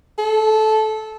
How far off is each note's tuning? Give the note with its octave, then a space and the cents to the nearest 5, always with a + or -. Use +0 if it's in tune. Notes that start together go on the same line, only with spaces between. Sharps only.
A4 -15